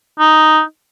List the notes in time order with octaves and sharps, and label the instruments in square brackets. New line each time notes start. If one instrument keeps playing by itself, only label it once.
[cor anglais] D#4